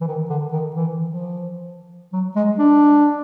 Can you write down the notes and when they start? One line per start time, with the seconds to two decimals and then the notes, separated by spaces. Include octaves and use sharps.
0.01 E3
0.07 D#3
0.30 D3
0.53 D#3
0.76 E3
1.10 F3
2.13 F#3
2.36 G#3
2.58 D4